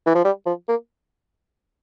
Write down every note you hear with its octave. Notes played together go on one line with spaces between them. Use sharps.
E3
F3
G3
F3
A#3